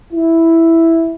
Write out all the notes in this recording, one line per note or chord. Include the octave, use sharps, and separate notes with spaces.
E4